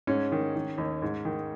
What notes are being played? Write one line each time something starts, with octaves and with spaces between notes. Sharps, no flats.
G#2 C#4
D#3
D#3
D#2
G#2
D#3